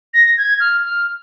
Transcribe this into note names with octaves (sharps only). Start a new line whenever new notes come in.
A#6
G#6
F6
F6